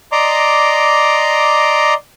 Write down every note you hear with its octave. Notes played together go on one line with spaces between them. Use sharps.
D5 D#5 A#5 C6 D6